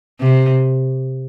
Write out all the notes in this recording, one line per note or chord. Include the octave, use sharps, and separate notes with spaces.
C3